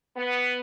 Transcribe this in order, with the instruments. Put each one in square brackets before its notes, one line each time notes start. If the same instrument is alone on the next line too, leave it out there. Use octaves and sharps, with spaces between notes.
[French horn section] B3